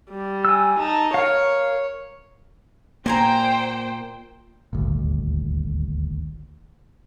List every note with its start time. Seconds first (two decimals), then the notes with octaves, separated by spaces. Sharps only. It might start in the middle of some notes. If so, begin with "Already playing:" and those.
0.11 G3
0.45 G#5 E6
0.80 D#4 A5
1.14 A#4 C#5 F5
3.06 A#2 A#3 C5 G5 G#5 A#5
4.73 D#1 G#1 D2